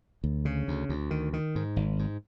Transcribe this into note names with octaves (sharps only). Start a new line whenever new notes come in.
D2
C#3
D2
D2
D#3
D#3
G#2
G#1
G#2